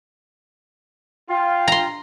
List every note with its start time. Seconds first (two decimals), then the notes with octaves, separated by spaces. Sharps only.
1.30 F4 G5
1.68 A#5 C6